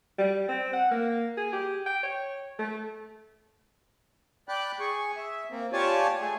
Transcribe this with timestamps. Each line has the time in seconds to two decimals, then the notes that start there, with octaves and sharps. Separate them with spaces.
0.19 G3
0.49 C4
0.73 F#5
0.91 A#3
1.37 G#4
1.53 G4
1.86 G5
2.03 C#5
2.59 A3
4.49 D5 G5 B5 F#6
4.80 G#4 C#6
5.17 E5
5.51 A#3 C4
5.73 F4 G4 C#5 D5 G#5 A5
6.21 A3 G#4